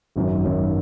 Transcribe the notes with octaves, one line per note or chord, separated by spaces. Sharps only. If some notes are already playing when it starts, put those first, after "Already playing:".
G#1 F#2 D#3 F#3
G#1 F#2 D#3 F#3